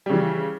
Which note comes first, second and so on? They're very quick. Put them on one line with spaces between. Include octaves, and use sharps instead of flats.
G3 C#3 E3